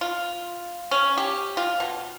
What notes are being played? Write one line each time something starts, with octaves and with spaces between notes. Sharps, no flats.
F4
C#4
G4
F4
B2